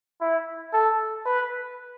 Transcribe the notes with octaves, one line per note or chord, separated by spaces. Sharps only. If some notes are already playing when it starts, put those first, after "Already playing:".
E4
A4
B4